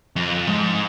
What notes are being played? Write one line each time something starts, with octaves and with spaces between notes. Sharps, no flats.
F2
G#2